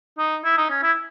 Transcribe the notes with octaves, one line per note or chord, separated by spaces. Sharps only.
D#4
E4
D#4
C#4
E4